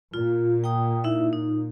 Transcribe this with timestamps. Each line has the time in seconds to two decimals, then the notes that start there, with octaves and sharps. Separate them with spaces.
0.14 A#2 F4
0.64 G5 A#5 D#6
1.04 D#4 E4 E5
1.33 D#4